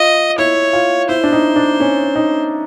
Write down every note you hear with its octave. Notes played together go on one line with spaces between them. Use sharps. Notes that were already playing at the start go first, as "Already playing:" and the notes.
Already playing: F4 D#5
E4 C#5
F4
E4 C5
D4
D#4
D4
C#4
D#4